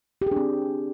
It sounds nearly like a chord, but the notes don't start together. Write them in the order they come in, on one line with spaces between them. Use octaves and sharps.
G4 G#4 D4 C4